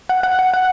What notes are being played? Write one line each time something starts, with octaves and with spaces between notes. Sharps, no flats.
F#5
F#5
F#5
F#5